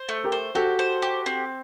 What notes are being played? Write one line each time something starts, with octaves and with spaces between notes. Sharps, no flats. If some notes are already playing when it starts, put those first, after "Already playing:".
Already playing: C5
A3
G4 A#4
C5
F#4 G4 A4
C5
G4
C4